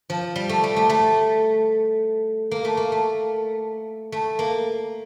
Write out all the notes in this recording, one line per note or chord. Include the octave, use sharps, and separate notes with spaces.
F3
G3
A3
G3
A3
A3
A#3
A3
A#3
A3
A3
A#3